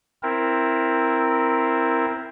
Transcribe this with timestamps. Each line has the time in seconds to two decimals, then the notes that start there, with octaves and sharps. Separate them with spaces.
0.23 C4 E4 A#4